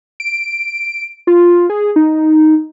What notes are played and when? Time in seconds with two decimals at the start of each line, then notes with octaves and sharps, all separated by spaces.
0.20 D7
1.27 F4
1.70 G#4
1.96 D#4